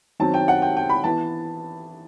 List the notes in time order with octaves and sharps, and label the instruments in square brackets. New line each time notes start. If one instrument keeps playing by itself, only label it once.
[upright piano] D#3 F#3 C4 A5
G5
F#5
G5
G5
B5
E3 B3 A5